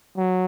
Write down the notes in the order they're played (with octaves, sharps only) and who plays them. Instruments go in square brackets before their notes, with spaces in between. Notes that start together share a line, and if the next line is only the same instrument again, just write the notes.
[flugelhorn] F#3